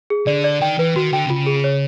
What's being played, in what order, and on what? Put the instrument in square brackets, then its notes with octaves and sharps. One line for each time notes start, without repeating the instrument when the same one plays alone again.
[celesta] G#4
[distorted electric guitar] D3 [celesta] D5
[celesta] D5
[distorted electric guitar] D#3 [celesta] G5
[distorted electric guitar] E3 [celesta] B4
[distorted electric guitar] D#3 [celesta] F#4
[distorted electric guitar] D3 [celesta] G5
[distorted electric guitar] C3
[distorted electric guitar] C#3 [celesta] F4
[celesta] G#4
C#5